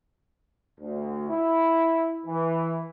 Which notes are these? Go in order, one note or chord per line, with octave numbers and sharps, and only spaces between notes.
D2
E4
E3